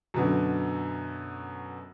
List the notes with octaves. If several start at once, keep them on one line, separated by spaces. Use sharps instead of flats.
F#2 B2 D3